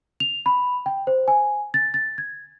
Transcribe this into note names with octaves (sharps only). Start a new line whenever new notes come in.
F7
B5
G5
C5
G#5
A6
A6
G#6